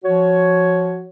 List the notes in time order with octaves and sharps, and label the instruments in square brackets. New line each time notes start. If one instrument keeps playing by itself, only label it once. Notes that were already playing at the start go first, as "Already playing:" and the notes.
[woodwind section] F3 F#4 C#5